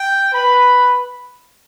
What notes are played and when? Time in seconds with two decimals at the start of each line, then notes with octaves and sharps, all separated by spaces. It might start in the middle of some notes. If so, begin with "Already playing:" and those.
Already playing: G5
0.33 B4 B5